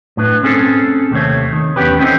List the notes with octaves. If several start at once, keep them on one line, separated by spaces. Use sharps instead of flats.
A2 D4 B4
C4 C#4 G#4 A4
D#2 C3 A3 C4 C5 C#5
D#3
E2 B3 C#4 G4 B4
C4 C#4 D#4 E4 A4 C5